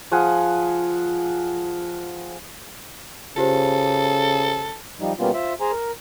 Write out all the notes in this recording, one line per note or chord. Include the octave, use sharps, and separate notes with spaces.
F3 F4 G#4 F#5
C#3 F4 G4 A4 C5
F3 G3 D#4
B2 G3 A#3 B3 C#4 F4
F4 C5 E5
G#4 C5 G#5 A#5
A#4